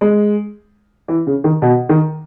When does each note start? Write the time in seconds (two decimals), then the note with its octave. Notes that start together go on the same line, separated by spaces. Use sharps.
0.01 G#3
1.08 E3
1.27 C#3
1.44 D#3
1.62 B2
1.89 D#3